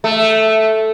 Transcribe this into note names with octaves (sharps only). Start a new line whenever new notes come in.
A3